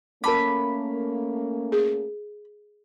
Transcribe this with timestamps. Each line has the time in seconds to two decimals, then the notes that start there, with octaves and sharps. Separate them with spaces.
0.24 A3 A#3 C#4 A#4 A5 B5 D6
1.72 G#4